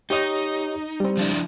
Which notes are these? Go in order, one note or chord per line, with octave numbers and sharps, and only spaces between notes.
D#4 G4 C#5 D#5
G3 C4
F3 D4 E4